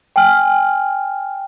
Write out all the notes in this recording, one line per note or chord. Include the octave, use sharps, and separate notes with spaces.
G5 G#5 F6